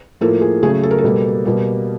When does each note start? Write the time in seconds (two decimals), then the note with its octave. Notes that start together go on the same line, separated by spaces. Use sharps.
0.21 A2 F3 A#3 A4
0.41 G#4
0.62 C#3 F#3 A3 G#4
0.83 A4
0.91 A#4
0.98 A4
1.04 B2 G3 A#3
1.45 B2 G3 A#3